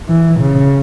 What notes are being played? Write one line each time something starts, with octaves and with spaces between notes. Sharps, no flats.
E3
C#3